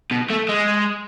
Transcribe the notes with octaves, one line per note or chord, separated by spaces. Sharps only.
B2
A3
G#3